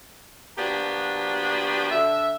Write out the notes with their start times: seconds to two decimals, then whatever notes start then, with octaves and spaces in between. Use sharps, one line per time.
0.58 F3 A#3 B3 D4 F#4 G4
1.91 D3 E5